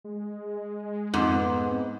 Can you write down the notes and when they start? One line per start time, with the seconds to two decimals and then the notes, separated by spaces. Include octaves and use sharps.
0.04 G#3
1.14 F2 G#2
1.33 B3
1.66 C4